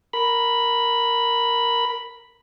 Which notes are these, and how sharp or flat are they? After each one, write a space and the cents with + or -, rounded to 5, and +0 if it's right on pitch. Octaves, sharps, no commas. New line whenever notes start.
A#4 +0 B5 +0